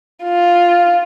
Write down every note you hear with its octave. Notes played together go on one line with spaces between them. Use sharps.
F4